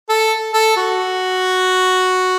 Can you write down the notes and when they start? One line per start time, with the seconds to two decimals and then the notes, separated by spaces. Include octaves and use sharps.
0.09 A4
0.53 A4
0.77 F#4